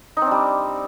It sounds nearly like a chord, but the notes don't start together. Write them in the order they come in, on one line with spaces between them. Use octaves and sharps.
D#4 C4 D4 G3